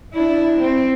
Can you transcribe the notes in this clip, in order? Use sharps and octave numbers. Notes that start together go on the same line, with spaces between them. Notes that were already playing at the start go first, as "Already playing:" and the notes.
D4 E4
C4